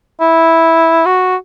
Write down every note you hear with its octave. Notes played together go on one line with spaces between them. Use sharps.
E4
F#4